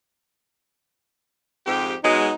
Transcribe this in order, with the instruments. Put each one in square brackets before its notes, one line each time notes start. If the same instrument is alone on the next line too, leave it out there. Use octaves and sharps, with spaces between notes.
[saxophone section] F2 G#2 G4
[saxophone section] B2 F#3 G#3 [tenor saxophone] D#4